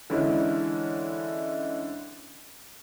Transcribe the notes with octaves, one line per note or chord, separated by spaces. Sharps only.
D3 E3 G#3 C#4 E4